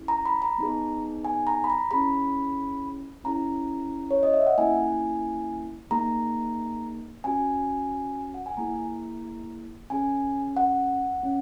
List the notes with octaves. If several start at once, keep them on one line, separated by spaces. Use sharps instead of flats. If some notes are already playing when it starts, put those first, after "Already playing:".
Already playing: C#4 E4 G#4
A#5
B5
A#5
B3 D#4 G#4
G#5
A#5
B5
A#5
C#4 E4 G#4 B5
C#4 E4 G#4 A#5
C#5
D#5
E5
F#5
A#3 C#4 E4 G#5
A#3 D#4 G#4 A#5
C#4 F#4 G#5
F#5
G#5
A#3 E4 G#4 A#5
C#4 G#4 G#5
F#5
C#4